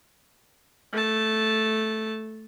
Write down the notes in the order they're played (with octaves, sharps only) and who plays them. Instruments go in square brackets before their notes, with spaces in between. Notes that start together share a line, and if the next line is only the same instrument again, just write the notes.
[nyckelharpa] A3 A5